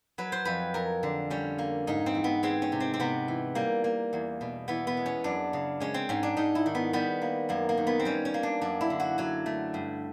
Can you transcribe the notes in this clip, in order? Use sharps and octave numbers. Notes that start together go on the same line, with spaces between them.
F#3 B4
C5
F2 B4
F2 A#4
D3
G3 C#4
A#3
G#2 D#4
C4
E3
B3
G#3 C4
C#4
C3
C4
C4
C3 B3
E3
G3 A#3
A#3
E2
B2
E3 B3
B3
G#3
C#4
F#2 D4
C#3
G#3 C#4
C4
G#2 C#4
D4
G#2 D#4
E4
D#3
B3
G3 B3
A#3
F#2 A#3
A#3
D#3
B3
C4
G3 C#4
C#4
A#3
D4
F#2 D4
E4
D3
F#4
F#3 F#4
A3
G2